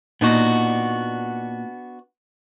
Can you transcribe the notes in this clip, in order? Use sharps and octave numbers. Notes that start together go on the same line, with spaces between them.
A#2 B3 D4 D#4 F#4